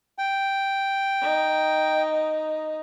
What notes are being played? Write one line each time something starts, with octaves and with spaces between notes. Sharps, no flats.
G5
D#4